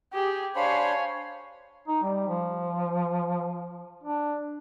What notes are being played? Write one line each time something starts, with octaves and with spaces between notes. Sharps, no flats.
G4 G#4
D4 C5 C#5 F5 G#5 B5
D#4
G3
F3
D4